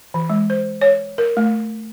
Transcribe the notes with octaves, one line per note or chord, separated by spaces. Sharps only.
E3
G#3
C5
C#5
A#4
A3